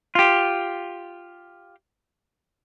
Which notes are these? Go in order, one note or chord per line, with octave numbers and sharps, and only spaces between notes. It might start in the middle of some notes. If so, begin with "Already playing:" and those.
F4 G4